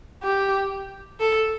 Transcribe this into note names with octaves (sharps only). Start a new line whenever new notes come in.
G4
A4